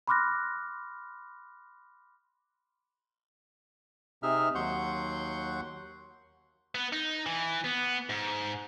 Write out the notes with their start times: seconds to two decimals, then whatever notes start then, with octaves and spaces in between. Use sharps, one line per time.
0.07 B5 C6 D6 F6 F#6 A#6
4.23 C3 D#4 G#4 E5 F6
4.55 D#2 F#3 F#5 C6 C#6 G6
6.75 B3
6.93 D#4
7.26 E3
7.64 B3
8.09 G#2